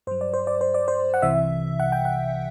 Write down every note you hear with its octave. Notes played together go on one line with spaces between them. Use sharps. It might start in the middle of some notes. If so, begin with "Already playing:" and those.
G2 F#3 C5
D5
C5
D5
C5
D5
C5
F#5
C2 C3 E3 E5
F#5
G5
F#5